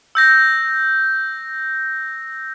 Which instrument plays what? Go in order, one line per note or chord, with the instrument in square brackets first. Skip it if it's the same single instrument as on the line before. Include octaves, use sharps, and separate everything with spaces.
[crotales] E6 G6 A#6